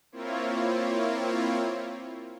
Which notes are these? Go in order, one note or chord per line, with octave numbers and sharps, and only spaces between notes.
A#3 C4 E4 F4 C#5